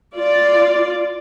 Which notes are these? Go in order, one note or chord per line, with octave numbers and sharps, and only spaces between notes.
F4 D5